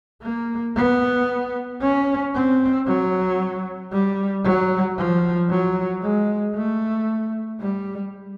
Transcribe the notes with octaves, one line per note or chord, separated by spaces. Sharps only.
A#3
B3
C#4
C4
F#3
G3
F#3
F3
F#3
G#3
A3
G3